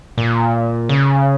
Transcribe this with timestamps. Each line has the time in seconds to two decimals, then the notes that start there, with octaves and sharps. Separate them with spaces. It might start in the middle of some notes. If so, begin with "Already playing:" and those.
0.18 A#2
0.89 C#3